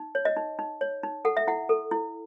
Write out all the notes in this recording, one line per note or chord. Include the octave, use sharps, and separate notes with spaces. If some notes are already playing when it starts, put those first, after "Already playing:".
Already playing: D#4
C#5
D#5
D#4
D#4
C#5
D#4
A4 F#5
E5
E4 F#5
A4
E4